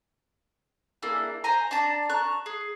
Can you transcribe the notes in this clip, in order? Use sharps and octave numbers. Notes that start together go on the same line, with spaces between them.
A#3 D4 E4 G#4
C5 G#5 A#5
D4 D5 A5 A#5
A5 A#5 C#6 F#6
G#4